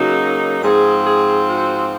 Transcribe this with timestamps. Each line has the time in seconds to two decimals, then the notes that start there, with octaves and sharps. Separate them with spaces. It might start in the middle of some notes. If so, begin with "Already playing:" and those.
Already playing: C#3 F#3 A#3 D#4 F#4
0.63 G#2 F3 C4 G#4
1.04 G#4
1.46 F#4